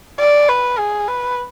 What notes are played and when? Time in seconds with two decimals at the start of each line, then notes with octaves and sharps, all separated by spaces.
0.20 D5
0.48 B4
0.78 G#4
1.08 B4